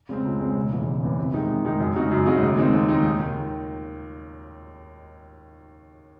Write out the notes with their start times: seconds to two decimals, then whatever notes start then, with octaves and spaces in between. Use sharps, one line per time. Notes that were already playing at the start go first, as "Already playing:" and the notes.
0.09 C#3 G#3 C4
0.25 C#2
0.40 C#3 G#3 C4
0.55 E1
0.71 D#2 C#3 E3
0.86 E1
1.02 D#2 C#3 E3
1.18 C3
1.34 D#3 G#3 D#4
1.49 C3
1.65 D#3 G#3 D#4
1.80 F#2
1.96 C#3 G#3 D#4 F#4
2.11 F#2
2.26 C#3 G#3 D#4 F#4
2.42 D#2
2.57 D#3 G#3 C4 D#4
2.73 D#2
2.89 D#3 G#3 C4 D#4
3.03 D#2
3.20 D#3